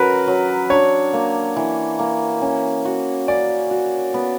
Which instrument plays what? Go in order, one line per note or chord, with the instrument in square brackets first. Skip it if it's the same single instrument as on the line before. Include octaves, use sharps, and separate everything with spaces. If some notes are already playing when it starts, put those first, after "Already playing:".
Already playing: [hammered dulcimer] F#3 C#4 F#4 [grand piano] A#4 B4
[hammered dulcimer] F#3
[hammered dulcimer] D4 [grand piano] C#5
[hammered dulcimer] A#3
E3
A#3
C#4
F#4
[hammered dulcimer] C#4 [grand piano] D5
[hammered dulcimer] F#4
B3